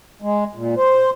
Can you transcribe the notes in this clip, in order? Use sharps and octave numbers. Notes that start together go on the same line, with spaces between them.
G#3
A#2
C5